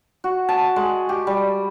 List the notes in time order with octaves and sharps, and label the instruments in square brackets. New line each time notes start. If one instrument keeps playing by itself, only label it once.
[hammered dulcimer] F#4
A5
G#3
G4
G3